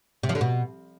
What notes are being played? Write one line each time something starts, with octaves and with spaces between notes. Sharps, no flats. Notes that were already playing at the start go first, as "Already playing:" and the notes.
C3
F3
D3
B2